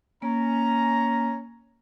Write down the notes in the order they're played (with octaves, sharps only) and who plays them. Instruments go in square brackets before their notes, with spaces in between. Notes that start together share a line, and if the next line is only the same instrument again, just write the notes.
[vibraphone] A#3 [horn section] C#4 A#5